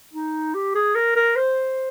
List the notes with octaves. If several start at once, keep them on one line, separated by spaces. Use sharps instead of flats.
D#4
G4
G#4
A#4
A#4
C5